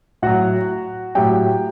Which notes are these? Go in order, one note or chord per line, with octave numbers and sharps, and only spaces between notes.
A2 F#3 F#4 F#5
A2 F#3 G4 G5